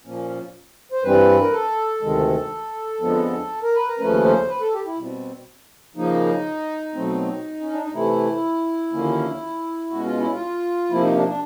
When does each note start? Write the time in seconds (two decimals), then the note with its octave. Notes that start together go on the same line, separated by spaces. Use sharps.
0.05 A#2 F3 A#3 C#4
0.92 C5
1.03 G2 E3 G3 C4 B4
1.41 A#4
1.52 A4
2.02 D2 C3 D#3 G#3
3.01 F2 D3 F3 G#3 B3
3.63 A#4
3.75 B4
3.88 A#4
3.99 D#2 C#3 F3 A3 C#4 B4
4.25 C5
4.49 B4
4.60 A4
4.73 G4
4.86 E4
4.97 B2 G3 C4
5.96 C#3 F3 A#3 D#4
6.95 B2 F#3 A3 C4
7.61 C#4
7.71 D4
7.82 D#4
7.93 C3 E3 A3 E4
8.93 D#2 D3 F3 A#3 C#4
9.91 B2 G#3 C#4 F#4
10.05 F4
10.18 E4
10.31 F4
10.90 C3 F3 A#3 E4
11.02 D#4
11.14 D4
11.27 D4